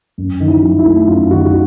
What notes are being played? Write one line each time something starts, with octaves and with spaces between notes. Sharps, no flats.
F#2
D#3
E4
F#3
E4
A3
F#2 F4
D#3 F#4
F#4